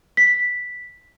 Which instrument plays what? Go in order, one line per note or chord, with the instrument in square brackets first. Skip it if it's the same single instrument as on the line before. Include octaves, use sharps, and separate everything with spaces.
[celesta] B6